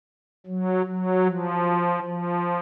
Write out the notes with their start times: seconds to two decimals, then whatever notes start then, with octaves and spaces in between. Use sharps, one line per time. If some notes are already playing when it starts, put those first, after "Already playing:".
0.46 F#3
0.86 F#3
1.25 F3
2.03 F3